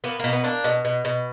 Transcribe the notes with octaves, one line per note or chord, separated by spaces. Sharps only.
A#3 B3
B2 A#3
B3
A#3 D4
B2
B2
B2